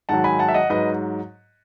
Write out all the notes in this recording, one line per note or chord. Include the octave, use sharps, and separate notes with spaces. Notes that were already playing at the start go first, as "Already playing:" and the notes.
G#2 D#3 F#3 F#5 A5
G#5 B5
F#5 A5
E5
D#5 F#5
G#2 F#3 B4 D#5